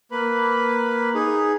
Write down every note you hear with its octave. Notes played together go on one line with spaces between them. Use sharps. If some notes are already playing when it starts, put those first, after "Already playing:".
A#3 B4 B5
D#4 G#4